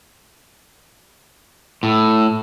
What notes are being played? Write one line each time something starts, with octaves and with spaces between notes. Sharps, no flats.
A2